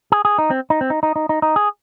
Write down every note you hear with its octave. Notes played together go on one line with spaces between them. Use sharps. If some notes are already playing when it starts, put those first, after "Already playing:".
G#4
G#4
D#4
C4
D#4
C4
D#4
D#4
D#4
D#4
D#4
G#4